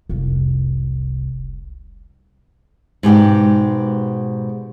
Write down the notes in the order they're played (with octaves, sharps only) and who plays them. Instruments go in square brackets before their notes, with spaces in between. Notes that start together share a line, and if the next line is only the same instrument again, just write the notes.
[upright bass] F1 C2
[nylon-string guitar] G#2 B2 G4 D5